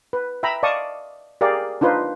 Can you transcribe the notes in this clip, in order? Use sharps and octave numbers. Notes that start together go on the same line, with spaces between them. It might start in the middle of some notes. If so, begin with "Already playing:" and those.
B4
E5 G5 A#5 B5
D5 D#5 F5 A5 C#6 D#6
G4 G#4 A#4 D5 F5
D4 D#4 F4 B4 C5